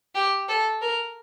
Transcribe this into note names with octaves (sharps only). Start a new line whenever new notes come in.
G4
A4
A#4